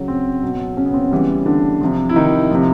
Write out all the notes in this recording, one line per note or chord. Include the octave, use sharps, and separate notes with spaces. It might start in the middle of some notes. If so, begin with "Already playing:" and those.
Already playing: C#3 F#3
C4
B2 F#3
C#3 C#4
B3
C4
C#3 E3 G3 B3
D3 D4
C3 F3
E4
D#3 D#4
C3 F3